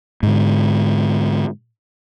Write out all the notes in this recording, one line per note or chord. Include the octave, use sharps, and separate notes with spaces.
G#2 D3